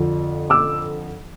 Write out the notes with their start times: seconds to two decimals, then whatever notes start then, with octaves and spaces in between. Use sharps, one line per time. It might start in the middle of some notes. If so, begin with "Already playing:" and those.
Already playing: F2 D3 F3
0.50 D6 E6